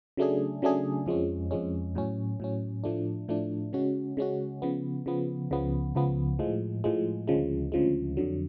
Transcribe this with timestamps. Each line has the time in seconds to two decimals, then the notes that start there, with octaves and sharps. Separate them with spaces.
0.17 C#3 F#3 A3 D4 G#4
0.62 C#3 F#3 A3 D4 G#4
1.06 F2 F3 G#3 C#4
1.51 F2 F3 G#3 C#4
1.95 A2 F#3 C#4
2.40 A2 F#3 C#4
2.84 A2 F3 A3 D4
3.28 A2 F3 A3 D4
3.73 C#3 G#3 C#4 F#4
4.17 C#3 G#3 C#4 F#4
4.62 C#3 F3 B3
5.06 C#3 F3 B3
5.51 C#2 C#3 F3 B3
5.95 C#2 C#3 F3 B3
6.39 A2 F3 G#3
6.84 A2 F3 G#3
7.28 D2 C#3 F3 G#3
7.72 D2 C#3 F3 G#3
8.17 F2 D3 F#3